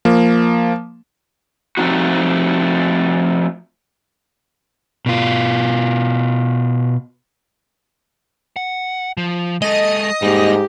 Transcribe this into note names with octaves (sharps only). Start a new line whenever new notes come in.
F3 A#3
F3 A3 C4 D#4 F#4
B2 F4
F#5
F3
G#3 A4 D#5
G#2 G3 A#3 G4